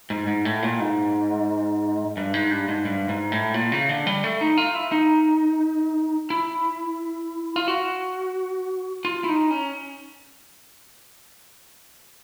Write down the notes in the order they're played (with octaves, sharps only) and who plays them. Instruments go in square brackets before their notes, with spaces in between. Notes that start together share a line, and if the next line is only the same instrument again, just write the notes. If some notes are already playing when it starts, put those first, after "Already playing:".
[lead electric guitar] G#2
G#2
A2
A#2
G#2
G2
G#2
G2
G#2
G2
G#2
A2
A#2
C#3
D3
G3
A3
D#4
F4
E4
D#4
E4
F4
F#4
F4
E4
D#4
C#4